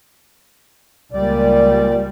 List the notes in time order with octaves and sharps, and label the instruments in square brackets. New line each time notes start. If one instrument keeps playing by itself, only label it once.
[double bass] C#2 G3 [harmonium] A#2 D5